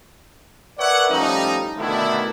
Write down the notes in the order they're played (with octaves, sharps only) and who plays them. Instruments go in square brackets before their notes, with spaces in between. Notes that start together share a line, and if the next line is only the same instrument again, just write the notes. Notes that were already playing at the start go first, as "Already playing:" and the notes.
[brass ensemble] A#4 B4 C#5 D5 E5 F#5
A2 F3 G3 C#4 D#4
B2 D3 D#3 A3 D4 E4